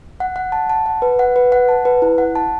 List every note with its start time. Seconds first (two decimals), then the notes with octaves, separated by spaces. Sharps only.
0.20 F#5
0.36 F#5
0.52 A5
0.70 A5
0.86 F#5
1.02 B4
1.19 F#5
1.36 B4
1.52 F#5
1.69 A5
1.85 B4
2.02 E4
2.18 F#5
2.35 A5